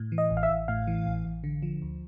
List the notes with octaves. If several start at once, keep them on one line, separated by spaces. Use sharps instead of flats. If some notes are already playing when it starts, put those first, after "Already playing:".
Already playing: A2
E3
D#5
A1
F5
E5
A1
A2 F5
E3
A1
A1
D3
F3
D2